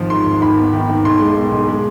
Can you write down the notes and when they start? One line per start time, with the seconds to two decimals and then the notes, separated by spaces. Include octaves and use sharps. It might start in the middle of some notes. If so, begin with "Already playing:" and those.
Already playing: G#1 F3
0.10 G#2 C6
0.26 G#1
0.41 D#2 B5
0.58 B3
0.73 D#3
0.89 D#2
1.05 B1 C6
1.20 G#3
1.36 B2
1.51 B1
1.68 G#3